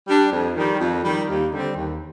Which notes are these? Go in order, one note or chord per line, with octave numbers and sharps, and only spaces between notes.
G3 D4
F2
D#3 G3
F2
D#3 G3
D#2
D3 G3 C4
D#2